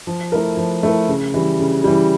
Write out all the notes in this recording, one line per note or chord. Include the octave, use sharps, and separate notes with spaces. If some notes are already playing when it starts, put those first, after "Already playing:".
F3
A3 E4 A#4
F3
A3 E4 A#4
C#3
E3 G3
C#3
E3 G3